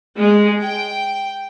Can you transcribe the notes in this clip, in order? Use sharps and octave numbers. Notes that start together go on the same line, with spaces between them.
G#3
G5